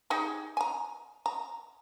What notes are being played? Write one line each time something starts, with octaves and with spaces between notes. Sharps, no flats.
D#4 G4 G#4
G#5 A#5
A#5